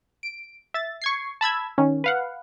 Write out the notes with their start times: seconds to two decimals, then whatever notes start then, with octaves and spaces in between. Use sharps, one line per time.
0.23 D7
0.74 E5 A6
1.02 C#6 G#6 C7
1.41 A5 B5 E6 G#6
1.78 D#3 C#4
2.04 B4 F5 F#5